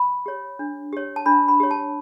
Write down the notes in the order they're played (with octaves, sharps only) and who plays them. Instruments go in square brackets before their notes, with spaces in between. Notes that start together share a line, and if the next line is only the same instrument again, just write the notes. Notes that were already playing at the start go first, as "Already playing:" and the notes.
Already playing: [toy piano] B5
G4 C#5
D4
G4 C#5
A5
D4 B5
B5
G4 C#5
A5